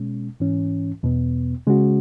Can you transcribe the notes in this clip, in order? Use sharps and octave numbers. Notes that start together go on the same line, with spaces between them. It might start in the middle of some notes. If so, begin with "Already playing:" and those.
Already playing: B2 G#3 C#4
G#2 E3 C#4
E2 B2 B3
C#3 G#3 C#4 F#4